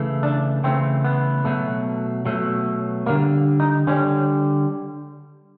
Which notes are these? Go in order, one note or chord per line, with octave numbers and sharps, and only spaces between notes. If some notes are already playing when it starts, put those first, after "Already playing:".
Already playing: C#3 E3 A3
D4
C#3 E3 A3 C4
B3
B2 F#3 A3
B2 F#3 A3
D3 G3 A#3
D#4
D3 G3 C#4